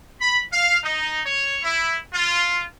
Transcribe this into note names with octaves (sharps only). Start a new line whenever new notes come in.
B5
F5
D#4
C#5
E4
F4